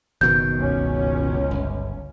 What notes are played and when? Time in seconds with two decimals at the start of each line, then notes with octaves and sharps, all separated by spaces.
0.21 F#1 B2 D#3 G6
0.57 C#2 C#4
1.51 G1